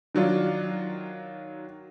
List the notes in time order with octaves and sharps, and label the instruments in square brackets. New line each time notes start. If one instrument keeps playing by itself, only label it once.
[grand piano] D#3 F#3 D4 F4